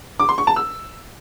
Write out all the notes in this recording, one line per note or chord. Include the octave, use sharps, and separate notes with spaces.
D6
C6
C#6
A5
E6